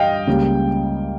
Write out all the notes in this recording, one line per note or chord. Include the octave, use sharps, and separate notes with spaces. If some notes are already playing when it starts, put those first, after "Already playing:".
Already playing: G2 D#5 F5 G5
C#2 C#3 G3 A#3